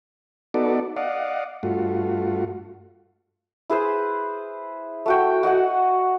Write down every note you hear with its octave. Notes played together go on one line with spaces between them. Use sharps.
B3 D#4 F#4 A4 D5
D5 D#5 F5 F#5
G2 A3 F4 F#4
E4 G#4 B4 C5
A3 F#4 G5
F#4 D#5 F#5 G#5